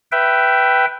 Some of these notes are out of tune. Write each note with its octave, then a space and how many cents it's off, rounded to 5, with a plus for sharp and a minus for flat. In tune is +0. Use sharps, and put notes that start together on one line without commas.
B4 +0 E5 +15 G5 -10